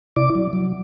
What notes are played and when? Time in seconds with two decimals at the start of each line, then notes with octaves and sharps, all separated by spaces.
0.16 C3 E4 D5 D6
0.35 F#3
0.53 F#3